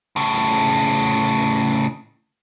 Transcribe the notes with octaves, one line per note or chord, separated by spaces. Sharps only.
A2 C#3